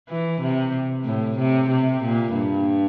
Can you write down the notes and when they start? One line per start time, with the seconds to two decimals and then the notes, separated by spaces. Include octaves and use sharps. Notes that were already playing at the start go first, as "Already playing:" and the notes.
0.09 E3
0.41 C3
1.06 A2
1.38 C3
1.69 C3
2.03 A#2
2.34 G2